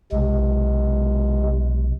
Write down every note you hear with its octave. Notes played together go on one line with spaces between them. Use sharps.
B1 C3 G#3